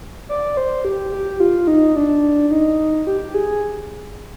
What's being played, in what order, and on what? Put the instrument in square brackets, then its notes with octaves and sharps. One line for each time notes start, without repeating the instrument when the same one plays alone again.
[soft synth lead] D5
C5
G4
G4
F4
D#4
D4
D#4
G4
G#4